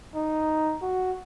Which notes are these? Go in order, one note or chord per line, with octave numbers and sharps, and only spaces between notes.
D#4
F#4